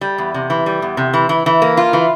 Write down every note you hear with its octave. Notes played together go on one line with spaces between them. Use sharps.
G3
E2
C3
E3
G3
E2
C3
E3
E3
E3
A#3
F4
E3